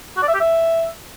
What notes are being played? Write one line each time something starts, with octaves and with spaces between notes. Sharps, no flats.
F#4
D5
E5
G4
E5